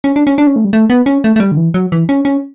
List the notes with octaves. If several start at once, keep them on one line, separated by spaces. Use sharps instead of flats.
C#4
D4
C#4
D4
C#4
A3
G3
A3
B3
C#4
A3
A3
G3
D3
E3
F#3
E3
C#4
C#4